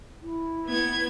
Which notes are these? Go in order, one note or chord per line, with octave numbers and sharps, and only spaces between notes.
E4
B3 G#6